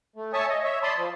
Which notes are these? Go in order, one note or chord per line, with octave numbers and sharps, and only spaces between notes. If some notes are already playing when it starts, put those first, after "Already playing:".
A3
C#5 E5 G#5 A5 C#6 D#6
D#5
C#5 E5
D5 A5 B5 C6 D#6
F3